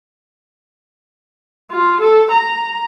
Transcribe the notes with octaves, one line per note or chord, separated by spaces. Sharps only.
F4
A4
A#5